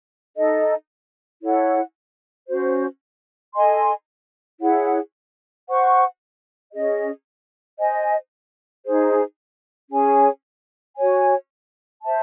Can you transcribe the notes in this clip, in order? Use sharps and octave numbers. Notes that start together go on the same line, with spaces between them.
D#4 A4 D#5
E4 A4 C#5 F#5
C#4 F#4 C5
A4 D#5 G#5 C6
E4 G#4 C#5 F#5
C5 F#5 C#6
C#4 G#4 D#5
C5 D#5 G#5
D#4 G#4 C5
C#4 G#4 C#5 G#5
F#4 C#5 G#5
C5 E5 A5